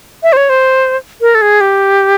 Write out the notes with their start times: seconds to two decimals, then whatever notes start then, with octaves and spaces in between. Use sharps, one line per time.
0.23 E5
0.33 C5
0.37 C#5
0.49 C5
1.21 A#4
1.35 A4
1.42 G#4
1.61 G4